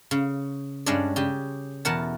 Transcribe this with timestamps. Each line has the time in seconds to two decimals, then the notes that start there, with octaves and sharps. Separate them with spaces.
0.11 C#3
0.86 G2 G#3 C#4 D4 D5
1.16 C#3 G4
1.85 E2 B2 A#4 F#5 A5